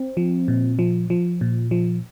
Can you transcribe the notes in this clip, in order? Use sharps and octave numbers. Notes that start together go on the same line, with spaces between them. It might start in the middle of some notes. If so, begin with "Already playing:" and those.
Already playing: C4
F3
A#2
F3
F3
A#2
F3